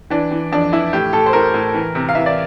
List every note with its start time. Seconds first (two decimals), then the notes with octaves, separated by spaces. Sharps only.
0.10 E3 D4
0.31 E3
0.52 F2 D4
0.72 E3 E4
0.93 A2 G4
1.13 A2 A4
1.26 C5
1.33 A2 A#4
1.54 A2
1.74 E3
1.95 C3
2.09 F5
2.15 E3 E5
2.26 D5